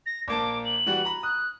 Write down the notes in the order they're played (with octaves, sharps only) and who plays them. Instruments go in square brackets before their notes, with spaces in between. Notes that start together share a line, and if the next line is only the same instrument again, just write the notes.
[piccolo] A#6
[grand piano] A#1 A#3 A5 [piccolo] D6
[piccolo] F#7
[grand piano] E3 G3 F#4
A#5 B5
[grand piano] D#6 [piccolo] F#6